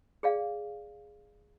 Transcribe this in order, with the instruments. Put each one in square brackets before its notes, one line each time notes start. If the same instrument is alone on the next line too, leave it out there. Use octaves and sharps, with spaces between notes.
[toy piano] G#4 D5 F5